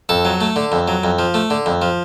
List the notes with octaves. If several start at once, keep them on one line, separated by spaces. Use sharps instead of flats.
F2 A4
F#3
A3
D3
F2
F#3
F2
F3
A3
D3
F2
F3